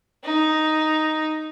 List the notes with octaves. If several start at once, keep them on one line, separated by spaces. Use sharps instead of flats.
D#4